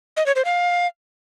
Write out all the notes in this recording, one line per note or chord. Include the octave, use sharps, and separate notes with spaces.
D#5
C#5
C5
F5